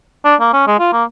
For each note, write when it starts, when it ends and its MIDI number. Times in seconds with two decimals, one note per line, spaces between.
0.25 0.35 62
0.40 0.50 58
0.53 0.63 61
0.67 0.74 56
0.79 0.89 65
0.92 1.04 58